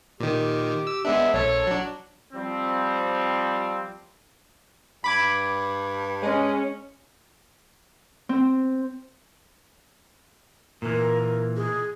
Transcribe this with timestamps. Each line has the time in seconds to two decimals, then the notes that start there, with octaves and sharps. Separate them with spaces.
0.20 A#2 D#3 G4
0.87 E6
1.05 G#3 B3 D4 E5
1.33 A#1 A4 C#5
1.67 F#3 D4
2.33 F3 G3 C4
5.04 G2 B5 D6 G#6
6.23 G#3 C#4
8.29 C4
10.82 A#2 E3 A#4
11.56 G#4